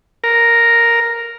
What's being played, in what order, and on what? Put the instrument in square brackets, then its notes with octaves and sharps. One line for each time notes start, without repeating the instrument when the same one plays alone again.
[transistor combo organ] A#4